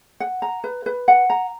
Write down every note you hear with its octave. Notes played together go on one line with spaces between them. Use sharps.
F#5
A#5
B4
B4
F#5
A#5